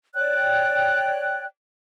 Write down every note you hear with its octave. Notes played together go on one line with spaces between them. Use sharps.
C#5 D5 G5 F#6